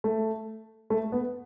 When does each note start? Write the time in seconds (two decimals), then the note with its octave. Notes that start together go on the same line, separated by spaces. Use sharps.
0.04 A3
0.90 A3
1.12 B3